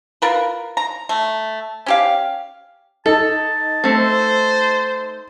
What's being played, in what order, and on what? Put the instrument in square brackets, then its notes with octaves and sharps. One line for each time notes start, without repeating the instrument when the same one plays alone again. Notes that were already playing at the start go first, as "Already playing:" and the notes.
[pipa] F4 A#4 B4
A#5
A3
C#4 G4 F5
[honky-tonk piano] D#4 [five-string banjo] A4 [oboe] A5
[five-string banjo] A3 C4 [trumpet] C5